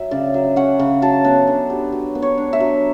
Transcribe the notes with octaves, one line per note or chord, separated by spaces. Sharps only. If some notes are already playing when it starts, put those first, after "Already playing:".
Already playing: F#3 E5
C#3 D5
F#3
C#4 F#5
C#3
F#3 A5
B3 B4
D4 A4
F#3 G4
F#3
B3
C#5
D4
E5
F#3